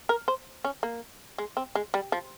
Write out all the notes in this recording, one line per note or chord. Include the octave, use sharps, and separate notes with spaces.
A#4
C5
C#4
A#3
G#3
C4
G#3
G3
F3